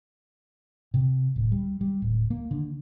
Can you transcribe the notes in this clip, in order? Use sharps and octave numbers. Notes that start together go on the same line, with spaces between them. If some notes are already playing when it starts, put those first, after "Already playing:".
C3
D1
G3
G3
D1
A#3
D3